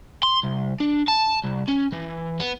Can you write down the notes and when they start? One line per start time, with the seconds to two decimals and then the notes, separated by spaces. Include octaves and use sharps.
0.23 C6
0.44 C2
0.80 D4
1.08 A5
1.44 C2
1.69 C#4
1.93 E3
2.40 B3